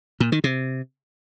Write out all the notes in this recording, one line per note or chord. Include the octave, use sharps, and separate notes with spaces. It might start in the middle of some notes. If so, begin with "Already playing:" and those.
A#2
D#3
C3